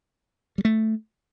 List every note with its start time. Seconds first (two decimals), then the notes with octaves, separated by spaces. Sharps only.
0.58 G3
0.65 A3